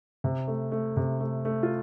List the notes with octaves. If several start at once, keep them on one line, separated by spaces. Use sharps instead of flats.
C3
A3
A3
C3
A3
A3
F4